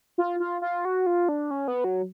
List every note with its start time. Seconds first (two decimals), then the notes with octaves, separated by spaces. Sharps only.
0.18 F4
0.40 F4
0.62 F4
0.85 F#4
1.06 F4
1.29 D4
1.51 C#4
1.68 B3
1.84 F#3